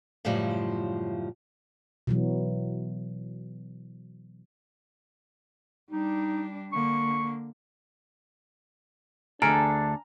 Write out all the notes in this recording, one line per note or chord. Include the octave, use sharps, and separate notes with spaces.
F#2 A2 C#3 F3 G3
B2 E3 F#3
G3 D4 D#4
D3 A#3 C#6
D2 D4 G#4 A4 G#5 A#5 F6 D7